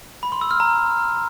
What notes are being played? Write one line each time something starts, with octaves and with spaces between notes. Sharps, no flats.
B5
C6
E6
F6
A#5